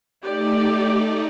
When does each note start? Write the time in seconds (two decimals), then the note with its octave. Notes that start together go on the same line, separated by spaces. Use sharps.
0.23 A3 D#4 G4 D5